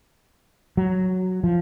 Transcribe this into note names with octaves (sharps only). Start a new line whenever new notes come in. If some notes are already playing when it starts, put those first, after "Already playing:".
F#3
F3